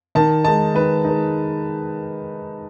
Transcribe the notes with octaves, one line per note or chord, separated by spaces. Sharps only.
D#3 A5
G#3 D#4 A5
D#3 B4
G#3 D#4